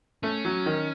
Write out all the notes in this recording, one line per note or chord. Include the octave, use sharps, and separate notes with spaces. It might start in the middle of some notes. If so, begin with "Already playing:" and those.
A3 C#4
F#3
D#3